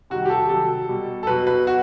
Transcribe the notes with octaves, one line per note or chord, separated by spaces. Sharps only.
C3 D#3 G3 F#4
G4
A4
C3 F#3 A4
B2 G3
A4
B2 F#3 B4
B4
B2 F#4